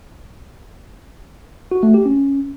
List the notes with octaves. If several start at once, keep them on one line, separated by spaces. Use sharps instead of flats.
F#4
A3
G4
C#4